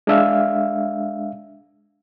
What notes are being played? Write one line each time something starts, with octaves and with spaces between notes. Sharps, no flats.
G#3 D4 E5 F5